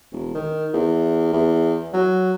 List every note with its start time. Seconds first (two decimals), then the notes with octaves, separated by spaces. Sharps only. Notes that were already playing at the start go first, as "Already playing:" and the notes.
0.12 E1
0.34 D#3
0.73 E2
1.33 E2
1.93 F#3